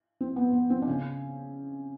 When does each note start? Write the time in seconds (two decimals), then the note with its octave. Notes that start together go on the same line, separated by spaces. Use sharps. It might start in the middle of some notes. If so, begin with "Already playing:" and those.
0.21 C4
0.36 B3
0.53 B3
0.70 C4
0.82 D4
0.87 C#3 C#4